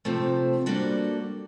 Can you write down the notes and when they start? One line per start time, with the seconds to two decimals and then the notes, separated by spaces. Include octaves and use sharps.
0.05 C3 F3 A3 C4
0.66 G3 A#3 D4 F#4 A4